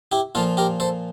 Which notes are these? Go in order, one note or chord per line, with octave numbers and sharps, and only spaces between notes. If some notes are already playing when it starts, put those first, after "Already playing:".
E4 G4
A#2 F3 F4 A4
G4 A#4
A4 C5